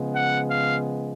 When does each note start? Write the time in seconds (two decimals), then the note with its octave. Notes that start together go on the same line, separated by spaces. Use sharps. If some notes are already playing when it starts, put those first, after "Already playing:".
Already playing: C#3 F3 G#3 B3
0.14 F#5
0.51 F5